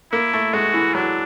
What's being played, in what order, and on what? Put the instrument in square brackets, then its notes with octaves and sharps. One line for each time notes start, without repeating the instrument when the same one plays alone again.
[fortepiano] A#3 [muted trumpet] E4
[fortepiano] A3
[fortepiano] G#3 [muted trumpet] F#4
[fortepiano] E3
[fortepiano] F#3 [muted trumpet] D4